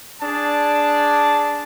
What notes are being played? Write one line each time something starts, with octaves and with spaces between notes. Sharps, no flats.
D4 G#4 A5